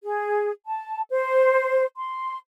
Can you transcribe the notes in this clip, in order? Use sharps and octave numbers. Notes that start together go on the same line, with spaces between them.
G#4
A5
C5
C6